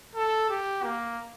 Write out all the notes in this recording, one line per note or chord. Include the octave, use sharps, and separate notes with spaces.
A4
G4
A#3